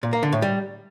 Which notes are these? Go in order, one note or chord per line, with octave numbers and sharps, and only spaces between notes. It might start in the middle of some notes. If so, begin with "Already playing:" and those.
A#2
A#3
D3
A2
G3